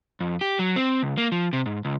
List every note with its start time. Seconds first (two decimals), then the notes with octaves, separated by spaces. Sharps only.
0.20 F2
0.41 G4
0.59 F#3
0.76 C4
1.03 C#2
1.18 A#3
1.32 F3
1.53 C3
1.66 G#2
1.85 C#2